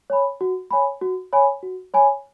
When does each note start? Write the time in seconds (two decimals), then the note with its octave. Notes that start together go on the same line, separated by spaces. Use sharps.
0.10 C#5 G#5 B5
0.41 F#4
0.71 C#5 G#5 B5
1.02 F#4
1.33 C#5 G#5 B5
1.63 F#4
1.94 C#5 G#5 B5